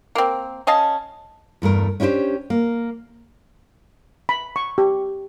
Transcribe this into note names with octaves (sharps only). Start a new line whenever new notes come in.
A#3 C4
C#4 D#5 F5 A5
E2 G2 A3 A#4
C#4 D4 E4 G4 C5
A#3
B5
C#6
G4